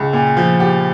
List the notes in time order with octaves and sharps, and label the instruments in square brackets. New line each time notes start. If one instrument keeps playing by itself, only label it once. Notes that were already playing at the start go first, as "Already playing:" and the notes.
Already playing: [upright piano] C#2
A#2
F3
G4